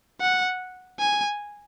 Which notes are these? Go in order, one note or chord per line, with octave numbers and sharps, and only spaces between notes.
F#5
G#5